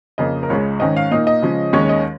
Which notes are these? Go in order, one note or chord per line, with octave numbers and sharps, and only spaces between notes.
F2 C#3 A#3 D#5
A#4
C#2 C#3 G#3 C#4 C#5
G#2 D#3 C#4 D#5
F5
A#2 A#3 D#4 D#5
D#5
C#3 F3 G#3 C#4
D#2 D#3 G#3 C#4 C#5
D#5